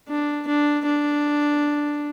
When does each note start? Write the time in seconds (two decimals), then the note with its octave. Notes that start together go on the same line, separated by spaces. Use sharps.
0.08 D4
0.47 D4
0.85 D4